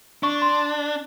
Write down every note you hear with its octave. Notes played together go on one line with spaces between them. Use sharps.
D4 C#6
C6